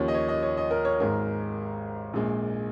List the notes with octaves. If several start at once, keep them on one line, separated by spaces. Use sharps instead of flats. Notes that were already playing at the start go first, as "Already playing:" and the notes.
Already playing: D#2 C#3 F3 C#5
D#5
C#5
D#5
C#5
D#5
A#4
C#5
G#1 G#2 G#3 A#4
A#1 A#2 G#3